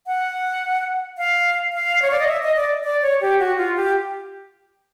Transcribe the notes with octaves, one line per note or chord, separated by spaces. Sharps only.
F#5
F5
F5
C#5
D5
D#5
E5
D#5
D5
D5
C#5
G4
F#4
F4
G4